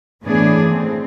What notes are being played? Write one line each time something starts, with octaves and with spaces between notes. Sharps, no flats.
A2 E3 B3 D4 G#4
D3 A3 C4